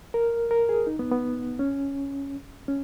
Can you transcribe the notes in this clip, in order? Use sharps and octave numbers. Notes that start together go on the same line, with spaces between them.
A#4
A#4
G#4
D#4
B3
B3
C#4
C#4